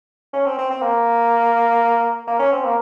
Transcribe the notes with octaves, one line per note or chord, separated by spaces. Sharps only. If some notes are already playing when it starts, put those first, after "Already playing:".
C#4
C4
C4
C4
A#3
A#3
C#4
C4
A#3